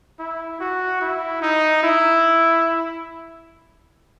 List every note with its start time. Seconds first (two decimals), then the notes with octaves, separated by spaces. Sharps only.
0.19 E4
0.60 F#4
1.01 E4
1.42 D#4
1.83 E4